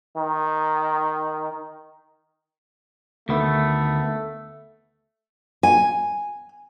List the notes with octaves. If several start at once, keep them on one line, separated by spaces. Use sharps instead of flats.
D#3
D2 D#3 A3 B3
G#5